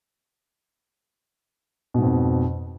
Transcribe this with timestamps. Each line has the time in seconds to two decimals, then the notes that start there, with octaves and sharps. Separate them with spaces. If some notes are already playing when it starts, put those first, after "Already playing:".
1.94 B2
1.98 G#2
2.02 F2